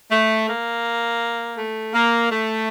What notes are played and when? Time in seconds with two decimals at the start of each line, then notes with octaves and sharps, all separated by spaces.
0.11 A3
0.48 A#3
1.57 A3
1.94 A#3
2.31 A3